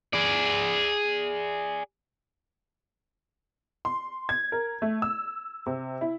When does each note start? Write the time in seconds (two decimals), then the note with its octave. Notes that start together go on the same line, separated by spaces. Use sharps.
0.13 G#4 D5
3.85 C6
4.29 G#6
4.52 A#4
4.82 A3
5.02 E6
5.66 C3
6.01 E4